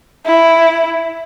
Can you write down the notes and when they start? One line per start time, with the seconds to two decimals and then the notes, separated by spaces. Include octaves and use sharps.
0.26 E4